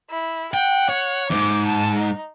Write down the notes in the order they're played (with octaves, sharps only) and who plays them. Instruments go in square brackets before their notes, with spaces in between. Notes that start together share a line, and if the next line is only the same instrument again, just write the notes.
[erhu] E4
[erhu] F#5 [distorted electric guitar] G5
[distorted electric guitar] C#5
[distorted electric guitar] E2 G#2 [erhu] D6
[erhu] A5
D#4